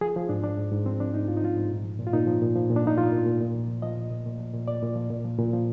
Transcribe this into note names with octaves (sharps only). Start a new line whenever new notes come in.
F3 G#4
F3
G#2 D4
F3 D4
G#2
G#2
F3 C4
F3 D4
G#2 D#4
G#2 F4
D#4
F3 F4
G#2
A#2
F3
A#2
F4
A#2 D#4
F3
A#2
F3
A#2
D4
F3 D#4
F3 F4
A#2
A#2
A#2
F3
F3
F3 D#5
A#2
A#2
A#2
F3
A#2
A#2 D5
A#2
F3
A#2
F3
A#2
F3